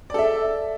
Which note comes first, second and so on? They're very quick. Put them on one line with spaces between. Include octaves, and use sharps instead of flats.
D5 A4 E5